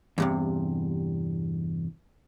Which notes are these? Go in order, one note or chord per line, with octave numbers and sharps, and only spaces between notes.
E2 G2 C3